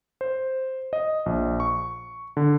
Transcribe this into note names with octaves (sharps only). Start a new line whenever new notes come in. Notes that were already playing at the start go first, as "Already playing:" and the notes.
C5
D#5
A#1
C#6
D3